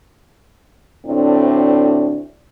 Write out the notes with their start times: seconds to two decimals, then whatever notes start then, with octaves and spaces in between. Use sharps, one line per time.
1.06 D2 A2 C4 D4